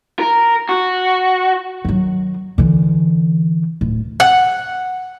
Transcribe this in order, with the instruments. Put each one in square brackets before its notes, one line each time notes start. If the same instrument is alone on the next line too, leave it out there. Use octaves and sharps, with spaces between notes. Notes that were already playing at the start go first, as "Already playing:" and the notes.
[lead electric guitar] A#4
F#4
[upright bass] D#3 F#3
D3 E3
D1
[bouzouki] F#5